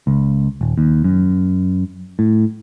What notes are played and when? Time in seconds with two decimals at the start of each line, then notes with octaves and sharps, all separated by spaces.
0.07 C#2
0.61 D#1
0.78 D#2
1.04 F#2
2.19 A2